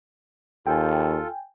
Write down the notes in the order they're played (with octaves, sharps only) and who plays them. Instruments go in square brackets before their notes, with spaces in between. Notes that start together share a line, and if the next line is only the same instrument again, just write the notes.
[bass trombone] D#2 [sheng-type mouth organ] F4 A4 [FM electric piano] G5 G#5